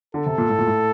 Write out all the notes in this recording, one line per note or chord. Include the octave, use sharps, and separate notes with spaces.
D3 A4
C3
A#2
A2
A#2
A2